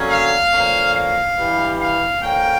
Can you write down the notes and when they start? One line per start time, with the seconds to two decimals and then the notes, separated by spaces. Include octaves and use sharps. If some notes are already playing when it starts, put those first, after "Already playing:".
Already playing: D3 F#3 A#3 C#4
0.09 F5
0.52 D3 F3 A#3 C#4
0.94 F5
1.36 G2 E3 G3
1.80 F5
2.22 D3 F3 A#3 C#4 G5